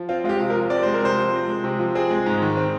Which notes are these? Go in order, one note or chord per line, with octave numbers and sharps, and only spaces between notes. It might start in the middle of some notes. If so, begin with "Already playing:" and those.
Already playing: F3
C4 F4
G#3 F4
G4
C3
A#4
F3
C4 D5
G#3 C5
A#4
C3 C5
F3
C4
G#3
C3
F3
C4 G#4
G#3
G#2
D#3
C4